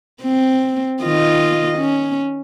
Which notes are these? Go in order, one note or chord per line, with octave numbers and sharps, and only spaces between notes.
C4
D#3 F4 D#5
C#4